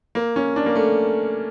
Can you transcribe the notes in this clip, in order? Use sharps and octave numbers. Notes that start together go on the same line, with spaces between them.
A#3
C#4
D4
A#3
A3